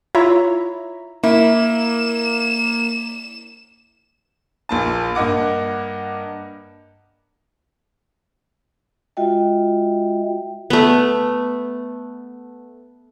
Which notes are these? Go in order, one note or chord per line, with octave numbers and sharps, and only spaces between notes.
E4 F4 C#5 E5 A#5 B5
A#3 E4 E7
A#1 A#2 A5
G2 A#3 D#5 F#5 D6
G#3 F4 F#4 D#5 E5 G5
A3 B3